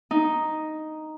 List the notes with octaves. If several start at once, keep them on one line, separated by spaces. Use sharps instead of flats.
D#4